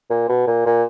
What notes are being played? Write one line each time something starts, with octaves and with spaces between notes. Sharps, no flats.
A#2
B2
A#2
A#2